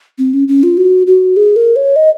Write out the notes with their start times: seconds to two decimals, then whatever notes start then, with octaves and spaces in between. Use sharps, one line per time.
0.18 C4
0.33 C#4
0.48 C#4
0.63 F4
0.77 F#4
1.07 F#4
1.37 G#4
1.56 A#4
1.76 C#5
1.96 D#5